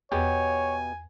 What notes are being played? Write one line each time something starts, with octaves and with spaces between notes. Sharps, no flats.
E2 B2 B3 G4 C#5 G#5